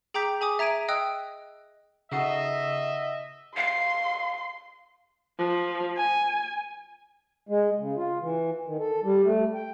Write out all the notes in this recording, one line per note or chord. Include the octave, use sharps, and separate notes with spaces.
G#4 G5 A#5 D6 G6 B6
G#4 G#5 D6 D#6
E5 A#5 G#6 D7 D#7
D#5 G5 D#6 E6 F#6
C#3 D#4 F#4 A4 D#5 E5 C7
F5 C6
F3
G#5
G#3
C#3
F4
E3
D#3
A4
G3
A3
G5